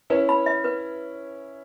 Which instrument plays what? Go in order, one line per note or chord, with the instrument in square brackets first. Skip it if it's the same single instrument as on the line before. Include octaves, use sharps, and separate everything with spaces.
[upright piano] C#4 E4 [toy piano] B4
[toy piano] B5
E5
B4